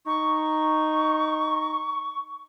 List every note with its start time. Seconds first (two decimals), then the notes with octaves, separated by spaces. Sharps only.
0.06 D#4 C#6